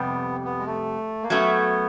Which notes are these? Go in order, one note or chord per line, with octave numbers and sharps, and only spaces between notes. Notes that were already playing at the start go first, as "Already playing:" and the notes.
Already playing: F2 C3 G3 B3
B3
G#3
A3
A#3
F#3 A3 B3 C#4 F#4